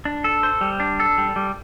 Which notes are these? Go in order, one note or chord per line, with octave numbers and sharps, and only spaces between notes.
D4
A4
C5
G3
D4
A4
G3
G3